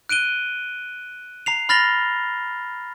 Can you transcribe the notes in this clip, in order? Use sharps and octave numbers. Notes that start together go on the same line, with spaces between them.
F#6 D7 D#7 G7
A#5 C7 F7
B5 F6 A6 A#6 F7 G7